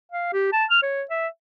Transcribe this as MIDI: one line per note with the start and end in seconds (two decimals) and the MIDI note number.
0.12 0.29 77
0.33 0.49 67
0.53 0.65 81
0.70 0.80 89
0.83 1.03 73
1.10 1.28 76